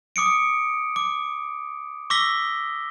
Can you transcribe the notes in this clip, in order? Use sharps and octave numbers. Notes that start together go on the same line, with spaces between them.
D6 D#6 C#7 D7
D6
C#6 D6 E6 A#6 B6 G7